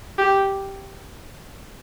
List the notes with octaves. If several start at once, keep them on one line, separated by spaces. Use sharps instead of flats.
G4